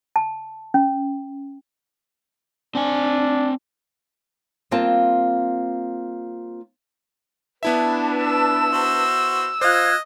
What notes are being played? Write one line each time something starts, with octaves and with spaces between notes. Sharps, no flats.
A5
C#4
C4 D4 G#5
G3 A#3 C4 F4 G5 A5
B3 D4 E4 B4 E5 A5
E6
F#4 C5
F4 C5 D#5 F5 F#6 G#6